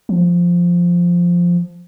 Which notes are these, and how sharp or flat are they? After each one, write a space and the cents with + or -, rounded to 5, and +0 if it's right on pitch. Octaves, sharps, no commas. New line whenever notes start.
F3 +0